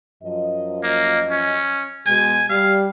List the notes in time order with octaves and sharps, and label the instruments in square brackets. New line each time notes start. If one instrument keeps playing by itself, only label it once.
[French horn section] F#2 F3 D#5
[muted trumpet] A#3
C#4
[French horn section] B2 G#3 [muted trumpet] G#5
[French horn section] G3 G4 [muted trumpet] F5